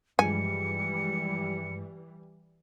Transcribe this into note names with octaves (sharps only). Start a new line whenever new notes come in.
G2 E3 F3 G3 G#3 G#5 C#7